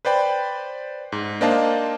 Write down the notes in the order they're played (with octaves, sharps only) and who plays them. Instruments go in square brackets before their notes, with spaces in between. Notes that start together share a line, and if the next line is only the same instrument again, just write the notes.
[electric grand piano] B4 C5 D5 G5 B5
G#2
A#3 D4 C5 D#5 F5 A5